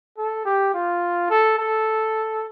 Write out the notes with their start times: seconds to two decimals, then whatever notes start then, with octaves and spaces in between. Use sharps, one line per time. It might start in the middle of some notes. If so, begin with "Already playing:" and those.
0.18 A4
0.45 G4
0.74 F4
1.30 A4
1.58 A4